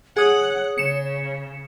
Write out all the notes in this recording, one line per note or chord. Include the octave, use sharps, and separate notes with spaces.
G#4 C#5 F#5 D#6
C#3 C#7 E7